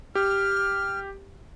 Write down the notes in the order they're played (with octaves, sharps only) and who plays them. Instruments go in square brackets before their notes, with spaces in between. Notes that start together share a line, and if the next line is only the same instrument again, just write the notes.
[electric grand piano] G4 [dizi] F6